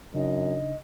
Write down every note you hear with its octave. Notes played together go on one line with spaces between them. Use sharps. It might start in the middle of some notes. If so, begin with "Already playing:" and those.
F#2 C#3 D4 D#4 D#5